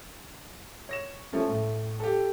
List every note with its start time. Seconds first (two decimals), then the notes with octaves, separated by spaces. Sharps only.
0.89 C#5 A#6 E7
1.32 F3 A3 C#4
1.48 A2 A3
2.00 G4 A4